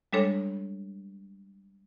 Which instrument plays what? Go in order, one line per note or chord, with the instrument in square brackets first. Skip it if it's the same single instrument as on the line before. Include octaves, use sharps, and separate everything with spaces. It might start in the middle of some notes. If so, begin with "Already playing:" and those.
[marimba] G3 G#3 D4 A4 C#5